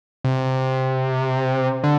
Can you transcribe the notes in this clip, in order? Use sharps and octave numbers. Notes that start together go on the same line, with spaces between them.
C3
D3